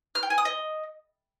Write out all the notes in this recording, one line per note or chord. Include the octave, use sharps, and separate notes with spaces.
F6
G5
G#5
D#6
D#5